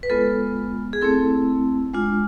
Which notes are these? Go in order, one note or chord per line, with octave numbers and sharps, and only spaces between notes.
B4
G#3 B3 F4 A4
G#4
A3 C4 E4 A4
G#3 D4 F4